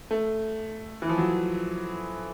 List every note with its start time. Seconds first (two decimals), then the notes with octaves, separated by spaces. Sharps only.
0.11 A3
1.02 E3
1.09 F3
1.18 F#3